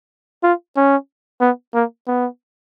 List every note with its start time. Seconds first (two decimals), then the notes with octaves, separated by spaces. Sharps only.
0.43 F4
0.77 C#4
1.41 B3
1.74 A#3
2.07 B3